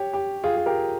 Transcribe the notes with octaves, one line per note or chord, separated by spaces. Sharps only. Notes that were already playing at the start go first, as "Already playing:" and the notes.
Already playing: G4 C#5
G4
F4 G#4
G#4
G4 A#4